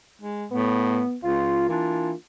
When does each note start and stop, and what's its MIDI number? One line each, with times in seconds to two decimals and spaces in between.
0.21 0.46 56
0.51 1.02 45
0.51 1.16 59
1.24 1.65 37
1.24 1.69 65
1.69 2.12 52
1.69 2.13 58
1.69 2.13 62
1.69 2.13 65